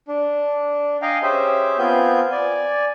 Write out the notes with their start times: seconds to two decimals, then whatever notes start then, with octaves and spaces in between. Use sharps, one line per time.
0.08 D4
1.02 D#5 F5 G5 G#5 A#5
1.23 C#4 G4 G#4 C5 E5
1.78 B3 C4 F4 G#5 G6
2.32 D5 G#5